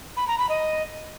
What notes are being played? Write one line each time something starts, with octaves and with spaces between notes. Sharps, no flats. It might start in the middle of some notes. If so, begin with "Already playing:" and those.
B5
A#5
B5
D#5